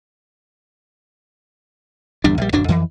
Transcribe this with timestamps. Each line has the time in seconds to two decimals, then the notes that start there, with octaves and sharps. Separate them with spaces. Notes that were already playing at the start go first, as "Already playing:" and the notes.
2.24 G1 E2 G3 D4
2.38 A#1 G3
2.53 D1 F#2 F#3 D4
2.68 F2 E3